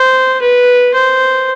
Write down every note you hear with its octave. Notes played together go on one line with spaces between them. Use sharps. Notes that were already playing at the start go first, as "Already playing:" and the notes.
Already playing: C5
B4
C5